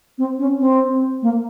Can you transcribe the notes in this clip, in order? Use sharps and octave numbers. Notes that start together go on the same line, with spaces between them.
C4
C#4
C4
A#3